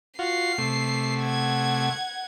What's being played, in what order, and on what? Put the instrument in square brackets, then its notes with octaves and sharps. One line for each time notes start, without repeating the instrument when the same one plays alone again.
[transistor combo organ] F4 F#4 [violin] C7
[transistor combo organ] C3 A3
[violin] F#5 G#6